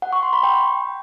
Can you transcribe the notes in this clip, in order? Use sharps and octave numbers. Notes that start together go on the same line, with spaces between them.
F#5
C#6
C6
B5
G5